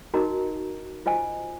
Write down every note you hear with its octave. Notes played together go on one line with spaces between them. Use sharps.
D#4 F#4 A#4 D#5 A#5
F4 C5 D#5 G#5